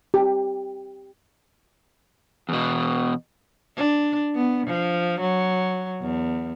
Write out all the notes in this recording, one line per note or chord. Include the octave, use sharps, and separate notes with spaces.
G4
E2 B2
D4
B3
F3
F#3
E2